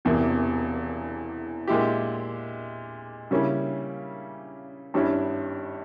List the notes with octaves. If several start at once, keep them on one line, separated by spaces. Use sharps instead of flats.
E1 E2 C3 E3 A#3
A#2 G#3 E4 G4
C#3 G3 A#3 C#4 E4
G#1 G2 G3 C#4 E4